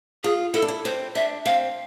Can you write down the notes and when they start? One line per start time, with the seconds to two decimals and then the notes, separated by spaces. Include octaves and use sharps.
0.24 F4 G#4
0.54 E4 A4
0.62 D4
0.68 E4
0.85 C4 C5
1.15 D4 E5
1.45 C4 F5